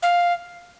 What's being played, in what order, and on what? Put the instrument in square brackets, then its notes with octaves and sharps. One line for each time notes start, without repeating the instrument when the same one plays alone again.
[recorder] F5